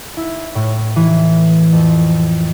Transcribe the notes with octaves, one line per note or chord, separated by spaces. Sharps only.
E4
A2
E3
F2